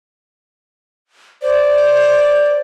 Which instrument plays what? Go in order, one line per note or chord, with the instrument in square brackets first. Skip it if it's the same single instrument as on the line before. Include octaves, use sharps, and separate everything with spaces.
[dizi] C5 [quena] D5